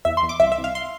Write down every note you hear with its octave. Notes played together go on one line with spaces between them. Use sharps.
E2 E5
C6
E2
D6
C2 E5
E5
C2
F5
C6